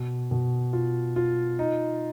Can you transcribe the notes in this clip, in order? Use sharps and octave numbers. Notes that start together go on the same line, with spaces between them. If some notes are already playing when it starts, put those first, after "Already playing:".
Already playing: B2
B2
F4
F4
D#4